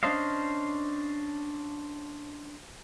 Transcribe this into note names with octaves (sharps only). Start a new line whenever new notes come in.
C#4 D4 C5 D#5 F5